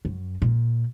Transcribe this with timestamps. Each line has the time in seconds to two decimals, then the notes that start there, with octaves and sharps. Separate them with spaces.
0.05 F#2
0.42 A#2